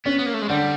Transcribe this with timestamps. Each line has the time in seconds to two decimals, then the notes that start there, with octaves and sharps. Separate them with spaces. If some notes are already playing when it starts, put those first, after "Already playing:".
0.05 B3 C#4
0.19 B3
0.26 A#3
0.34 A3
0.42 G#3
0.49 D3 G3